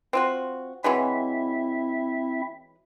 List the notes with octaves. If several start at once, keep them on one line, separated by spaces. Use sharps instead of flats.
C4 F4 F#4
E3 F#3 G#3 C4 E4 E5